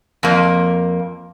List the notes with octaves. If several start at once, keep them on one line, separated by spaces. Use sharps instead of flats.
F2 A#3